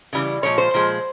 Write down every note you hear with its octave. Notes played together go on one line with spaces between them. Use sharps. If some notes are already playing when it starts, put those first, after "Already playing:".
C#3 E3 G3
A#2 F3 G#3 C#5
C5
A#2 F3 G#3